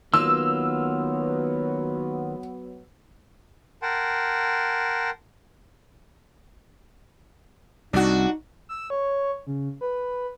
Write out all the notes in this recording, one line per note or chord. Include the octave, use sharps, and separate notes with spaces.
D#3 F#3 A#3 B3 F4 E6
A#4 F#5 G5 A5 C6
C2 D4 D#4 F#4
E6
C#5
C#3
B4